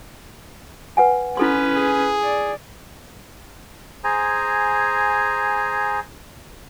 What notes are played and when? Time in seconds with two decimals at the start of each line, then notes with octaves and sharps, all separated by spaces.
0.97 B4 F#5 G#5
1.37 C#4 E4 A4 B4 C6
1.76 G#4
2.23 D5
4.04 G#4 C5 G#5 A#5